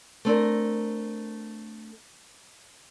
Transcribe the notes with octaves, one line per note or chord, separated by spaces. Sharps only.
A3 C4 D4 A#4